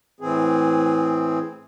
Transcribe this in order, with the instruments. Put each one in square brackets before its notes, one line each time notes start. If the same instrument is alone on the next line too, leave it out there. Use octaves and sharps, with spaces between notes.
[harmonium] A2 E3 C4 G#4